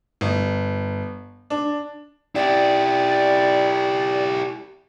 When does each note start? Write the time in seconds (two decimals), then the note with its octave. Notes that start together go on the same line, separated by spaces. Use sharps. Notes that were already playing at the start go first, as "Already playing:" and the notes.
0.21 G1
1.50 D4
2.35 E4 G4 D5